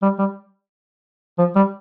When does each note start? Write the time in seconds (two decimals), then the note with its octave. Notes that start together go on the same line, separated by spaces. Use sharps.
0.02 G3
0.19 G3
1.38 F3
1.56 G3